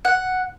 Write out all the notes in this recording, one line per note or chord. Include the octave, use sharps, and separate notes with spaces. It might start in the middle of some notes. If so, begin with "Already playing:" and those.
F#5